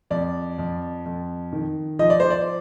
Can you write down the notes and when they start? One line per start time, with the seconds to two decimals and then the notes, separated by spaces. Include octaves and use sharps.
0.10 F2 D5
0.58 F2
1.05 F2
1.53 D#3
1.99 F3 D#5
2.10 D5
2.20 C5
2.30 D5